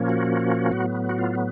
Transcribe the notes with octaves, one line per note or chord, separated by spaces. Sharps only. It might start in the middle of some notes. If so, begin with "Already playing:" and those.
Already playing: A#2 F3 A#3 C#4
F#4
A2 F#3 B3
F#4
F4